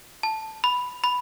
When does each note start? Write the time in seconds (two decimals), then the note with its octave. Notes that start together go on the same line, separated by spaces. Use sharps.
0.23 A5
0.64 B5
1.04 B5